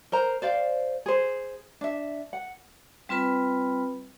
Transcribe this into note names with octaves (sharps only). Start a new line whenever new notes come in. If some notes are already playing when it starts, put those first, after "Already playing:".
A#4 C5 A#5
C5 D5 F5
G#4 C5
D4 E5
F#5
G3 C4 F4 B4 B5